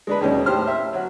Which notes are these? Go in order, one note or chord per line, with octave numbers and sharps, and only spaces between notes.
G#3 D4 B4
D#2 B2 D#3 G#3 C#4
A2 G4 C5 F6
E5
F#3 F#4